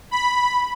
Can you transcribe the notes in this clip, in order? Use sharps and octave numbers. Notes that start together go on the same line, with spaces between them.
B5